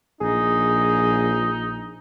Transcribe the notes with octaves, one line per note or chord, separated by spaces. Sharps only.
A#1 D#4 G#4